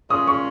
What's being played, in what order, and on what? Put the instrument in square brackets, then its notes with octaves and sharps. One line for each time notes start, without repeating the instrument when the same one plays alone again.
[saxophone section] A#2 G#3 C#4 [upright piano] D#6
[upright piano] C#6